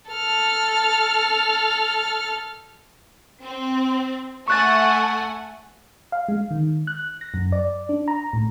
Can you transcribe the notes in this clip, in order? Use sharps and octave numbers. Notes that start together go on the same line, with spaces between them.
A4 F6
C4
A3 F#5 G#5 C#6 F#6 A6
F5
G#3
D#3
F#6
A#6
F#2
D5
D4
A#5
A2